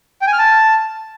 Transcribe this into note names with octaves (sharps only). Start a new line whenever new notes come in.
G5
G#5
F6
A5